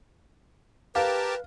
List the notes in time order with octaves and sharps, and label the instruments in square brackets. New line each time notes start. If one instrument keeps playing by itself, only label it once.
[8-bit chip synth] G4 A#4 A5 [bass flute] B4 [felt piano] F5